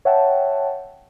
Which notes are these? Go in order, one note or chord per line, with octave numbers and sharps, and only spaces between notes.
C#5 E5 F#5 G5 A5